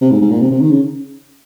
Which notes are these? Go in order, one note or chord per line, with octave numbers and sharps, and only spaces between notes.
C3
G#2
G#2
A#2
C3
C3
D#3
C#3